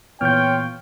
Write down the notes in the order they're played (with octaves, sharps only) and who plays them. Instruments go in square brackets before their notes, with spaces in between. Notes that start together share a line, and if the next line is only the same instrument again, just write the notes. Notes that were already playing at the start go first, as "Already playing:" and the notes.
[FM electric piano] A#2 E3 B3 [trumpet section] F4 G5 [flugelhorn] C#5 [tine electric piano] F6 G6